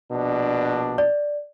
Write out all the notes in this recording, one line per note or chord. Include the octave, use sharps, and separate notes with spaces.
A#1 B2 D4
D5